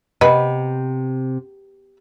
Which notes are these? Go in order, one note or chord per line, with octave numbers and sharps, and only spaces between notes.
C3 B3 B4 D#5